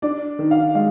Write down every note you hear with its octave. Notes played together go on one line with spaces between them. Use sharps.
D4 D5
D#3
F5
G#3 F5